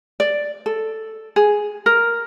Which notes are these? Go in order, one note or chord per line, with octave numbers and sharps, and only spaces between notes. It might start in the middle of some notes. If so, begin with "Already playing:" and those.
D5
A4
G#4
A#4